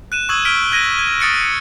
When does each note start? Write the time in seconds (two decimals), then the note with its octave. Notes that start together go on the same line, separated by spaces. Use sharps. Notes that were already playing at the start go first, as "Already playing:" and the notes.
0.12 F#6 D#7 E7
0.29 C#6 D#6 E6 G#6 F#7
0.45 F6 B6 D7 G7
0.72 F#6 G#6 A#6 D#7 G7
0.99 G#6
1.20 D#6 A6 C#7 D7